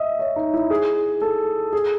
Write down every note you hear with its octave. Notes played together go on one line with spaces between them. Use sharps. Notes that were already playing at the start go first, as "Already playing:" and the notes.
Already playing: D#5 E5
C#5
D#4
E4
G#4
A4
G#4